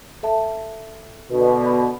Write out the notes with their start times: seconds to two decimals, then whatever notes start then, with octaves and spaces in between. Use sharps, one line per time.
0.23 A4 E5 A5
1.30 B2 D3
1.66 B5